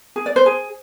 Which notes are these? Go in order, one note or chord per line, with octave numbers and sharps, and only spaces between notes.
G#4
D5
C5
G#4